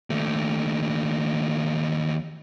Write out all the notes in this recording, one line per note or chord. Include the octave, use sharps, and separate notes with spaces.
D#2 A3